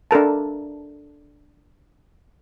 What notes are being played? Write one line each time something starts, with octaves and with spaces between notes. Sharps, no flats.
D4 A4 A#4 A5